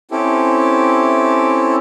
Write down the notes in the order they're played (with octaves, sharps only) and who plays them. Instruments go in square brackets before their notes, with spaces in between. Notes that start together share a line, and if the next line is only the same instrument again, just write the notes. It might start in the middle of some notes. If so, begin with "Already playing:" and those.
[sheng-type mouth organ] C4 C#4 E4 G4 A4